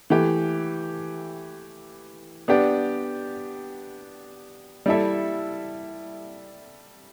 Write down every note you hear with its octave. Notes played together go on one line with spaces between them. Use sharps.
E3 A3 G4
B3 D4 G4 D5
G3 E4 A4 E5